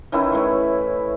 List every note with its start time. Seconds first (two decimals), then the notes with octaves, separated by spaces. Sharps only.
0.12 D#3 E3 C#4 E4
0.32 A2 B4 C#6